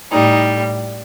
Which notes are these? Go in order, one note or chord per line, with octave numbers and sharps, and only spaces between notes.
A2 G3 D#4